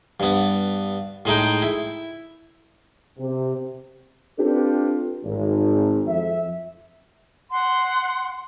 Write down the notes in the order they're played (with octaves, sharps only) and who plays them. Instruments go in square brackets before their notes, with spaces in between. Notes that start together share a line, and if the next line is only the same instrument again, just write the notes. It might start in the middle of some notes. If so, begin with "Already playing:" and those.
[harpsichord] G2 B3
A2 G#3 D#4 G5
E4
[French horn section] C3
[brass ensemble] C4 D4 F4 G4 A4 B4
G#1
F2 E5
[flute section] F#5 C6